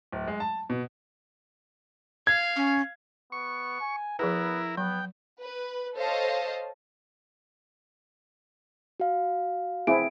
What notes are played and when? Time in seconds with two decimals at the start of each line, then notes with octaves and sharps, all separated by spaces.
0.12 D1
0.27 G#3
0.40 A5
0.70 B2
2.27 F5 G#6
2.56 C#4
3.32 B3 C#6
3.80 G#5
4.19 F3 B3 E4 G#4 A#4 B4
4.77 F#3 B3 G5
5.42 B4
5.96 A4 C5 C#5 D#5 F5 A5
9.00 F#4 F5
9.87 C4 E4 G#4 D7